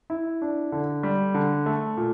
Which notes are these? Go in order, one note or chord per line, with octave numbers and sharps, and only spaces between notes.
E4
D4
D3
G3
D3
A3
A#2